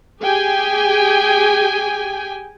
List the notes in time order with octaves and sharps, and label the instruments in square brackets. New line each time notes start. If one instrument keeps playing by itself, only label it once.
[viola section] G4 G#4 G5 G#5